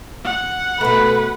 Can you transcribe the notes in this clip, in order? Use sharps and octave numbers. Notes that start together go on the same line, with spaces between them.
F#5
B2 A3 B4